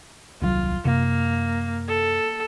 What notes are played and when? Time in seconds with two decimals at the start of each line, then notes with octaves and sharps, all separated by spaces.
0.42 D#1 C2 F#3 F4
0.85 F#2 C3 A#3
1.88 A4